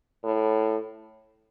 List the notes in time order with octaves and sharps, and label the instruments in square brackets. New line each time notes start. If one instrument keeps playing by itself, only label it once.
[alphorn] A2